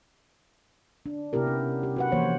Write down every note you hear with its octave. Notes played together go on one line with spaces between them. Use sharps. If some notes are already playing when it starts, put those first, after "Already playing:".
D4
C3 B3 E4 G4 A#4
C#4
G4
F#4 B4 F#5
E3 F3 A#3 C5 C#5